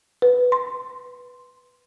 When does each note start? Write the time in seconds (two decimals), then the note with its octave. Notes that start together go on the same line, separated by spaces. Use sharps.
0.22 B4
0.52 C6